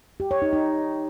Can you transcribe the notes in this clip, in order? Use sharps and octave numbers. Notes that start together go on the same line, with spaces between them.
G4
C#5
D#4
D#4